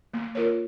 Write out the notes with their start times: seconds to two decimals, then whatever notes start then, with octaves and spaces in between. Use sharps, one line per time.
0.14 A#3
0.35 F4 A#4 C#5